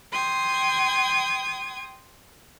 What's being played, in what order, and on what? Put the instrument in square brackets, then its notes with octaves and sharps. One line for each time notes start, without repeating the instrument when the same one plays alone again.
[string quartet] G5 C6 D#6 G#6